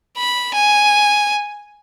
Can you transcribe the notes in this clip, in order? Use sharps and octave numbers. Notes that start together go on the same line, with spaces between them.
B5
G#5